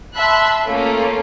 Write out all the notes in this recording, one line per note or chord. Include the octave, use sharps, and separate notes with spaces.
E5 A5 B5 C6 E6 F#6
A3 A#3 C#4 F4 A4